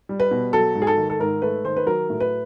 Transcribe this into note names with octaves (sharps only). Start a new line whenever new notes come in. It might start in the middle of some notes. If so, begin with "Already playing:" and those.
G3
B4
B2
F#3 A4
G#2
G#4
A4
D#3
A4
G#2 A#4
A3 B4
D#3 C5
B4
F#3 A#4
A2
B4